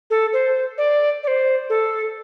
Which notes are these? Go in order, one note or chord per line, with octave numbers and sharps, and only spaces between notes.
A4
C5
D5
D5
C5
A4